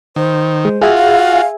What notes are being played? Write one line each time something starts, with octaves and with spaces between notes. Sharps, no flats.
D#3 C5
G#3
F4 F#4 G#4 E5 G#5
F5